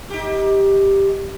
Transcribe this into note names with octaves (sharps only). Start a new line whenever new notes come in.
D#4 G4